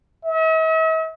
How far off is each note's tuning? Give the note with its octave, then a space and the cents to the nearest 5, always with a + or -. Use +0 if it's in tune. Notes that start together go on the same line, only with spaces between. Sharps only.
E5 -45